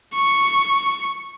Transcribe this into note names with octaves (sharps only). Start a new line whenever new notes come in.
C#6